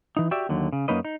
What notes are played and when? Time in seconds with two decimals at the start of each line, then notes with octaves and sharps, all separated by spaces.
0.17 E3 D#4
0.31 F#4 G4 D5 E5
0.49 D#2 D3 F#3
0.72 C#3
0.88 F#2 A#3 C#4 D#4 B4 D#5
1.05 D#4